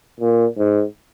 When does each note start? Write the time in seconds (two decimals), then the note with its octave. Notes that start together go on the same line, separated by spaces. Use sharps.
0.20 A#2
0.57 G#2